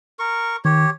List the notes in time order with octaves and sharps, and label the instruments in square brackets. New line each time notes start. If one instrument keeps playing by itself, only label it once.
[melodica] A#4 C#6
[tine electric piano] D#3 [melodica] G4 C#5